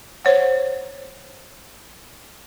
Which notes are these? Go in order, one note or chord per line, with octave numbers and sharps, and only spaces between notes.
C5 C#5 F#5